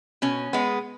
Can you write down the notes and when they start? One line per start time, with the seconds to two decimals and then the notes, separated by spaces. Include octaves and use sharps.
0.22 B2 C#4
0.53 G#3 B3